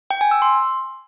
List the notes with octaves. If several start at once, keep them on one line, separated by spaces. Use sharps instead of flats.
G5
G#5
E6
C6